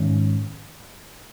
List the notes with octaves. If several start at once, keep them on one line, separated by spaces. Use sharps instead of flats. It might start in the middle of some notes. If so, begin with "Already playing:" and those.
Already playing: G#2 D#3 G#3 C#4